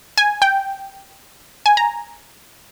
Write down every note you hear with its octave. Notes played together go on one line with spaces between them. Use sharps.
G#5
G5
G#5
A#5